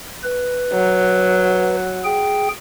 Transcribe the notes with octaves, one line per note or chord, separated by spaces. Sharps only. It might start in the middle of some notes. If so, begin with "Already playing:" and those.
B4
F#3
G#4 G5